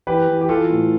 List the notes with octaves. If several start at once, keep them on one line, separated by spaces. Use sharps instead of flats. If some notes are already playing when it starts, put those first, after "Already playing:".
E3 G4 B4
E3
G4
E3 F4 A4
A2